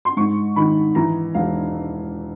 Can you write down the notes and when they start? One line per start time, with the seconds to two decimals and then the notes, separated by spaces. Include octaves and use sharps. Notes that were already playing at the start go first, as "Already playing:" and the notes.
0.05 C6
0.17 G#2 C#6
0.56 D#3 B5
0.95 E3 A#5
1.34 E1 F5